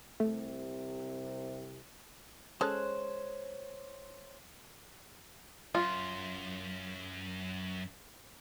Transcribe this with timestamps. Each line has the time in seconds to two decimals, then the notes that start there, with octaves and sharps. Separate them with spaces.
0.20 C2 C3 A3
2.61 G#3 C#4 A4 C5 C#5 F#6
5.75 F#2 F4